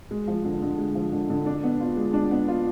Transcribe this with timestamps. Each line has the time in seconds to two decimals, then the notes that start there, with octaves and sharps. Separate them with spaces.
0.11 G#3
0.28 F3
0.45 D3
0.62 D3
0.79 G#3
0.95 F3
1.12 D3
1.30 D3
1.46 D4
1.63 B3
1.80 F4
1.96 G#3
2.13 D4
2.31 B3
2.48 F4